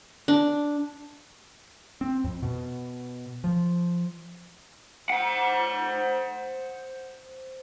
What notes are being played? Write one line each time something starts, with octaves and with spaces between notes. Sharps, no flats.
D4
C4
F2
B2
F3
C5 F#5